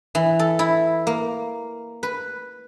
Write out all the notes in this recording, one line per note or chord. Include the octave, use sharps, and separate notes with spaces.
E3
A4
E4
A#3
B4